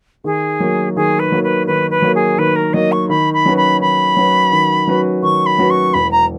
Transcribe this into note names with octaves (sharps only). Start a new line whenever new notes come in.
D#3 G#4
F#3 A#3
D#3 G#4
B4
F#3 A#3
B4
D#3 B4
B4
F#3 A#3
G#4
D#3 B4
A#4
F#3 A#3 D#5
C#6
D#3 B5
B5
F#3 C#4 F#4 B4
B5
D#3 B5
F#3 C#4 F#4 B4
D#3
F#3 C#4 F#4 B4
D#3 C#6
B5
F#3 C#4 F#4 B4
C#6
E1 B5
A#5